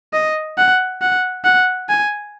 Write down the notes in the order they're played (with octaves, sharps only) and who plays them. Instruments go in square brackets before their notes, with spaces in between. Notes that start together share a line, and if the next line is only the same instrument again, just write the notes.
[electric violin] D#5
F#5
F#5
F#5
G#5